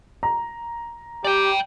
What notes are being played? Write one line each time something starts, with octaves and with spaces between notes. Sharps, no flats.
A#5
G4 D5 G5